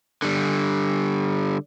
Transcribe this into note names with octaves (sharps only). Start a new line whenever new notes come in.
D3 G3